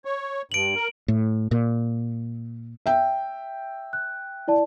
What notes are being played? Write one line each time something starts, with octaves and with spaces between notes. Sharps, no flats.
C#5
G2 D7 F#7
A#4
A2
A#2
E5 G5
F#6
E4 D5 A5